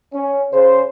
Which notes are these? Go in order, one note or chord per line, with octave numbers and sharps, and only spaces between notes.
C#4
C#3 C5